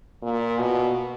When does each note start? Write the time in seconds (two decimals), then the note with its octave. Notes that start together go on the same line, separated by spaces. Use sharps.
0.23 A#2
0.59 B2